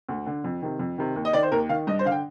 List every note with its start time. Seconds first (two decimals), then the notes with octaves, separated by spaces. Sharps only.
0.09 D2
0.26 D3
0.44 F2
0.62 C3 D#3
0.79 F2
0.98 C3 D#3
1.16 D#2
1.25 D#5
1.33 D#3 D5
1.43 C5
1.52 D#2 A#4
1.69 D#3 F5
1.87 G2 D#5
1.99 C5
2.05 D3 F5
2.12 G5